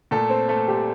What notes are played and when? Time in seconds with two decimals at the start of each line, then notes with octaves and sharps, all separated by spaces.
0.11 A#2 A3 A4
0.30 C4 C5
0.49 A3 A4
0.68 G3 G4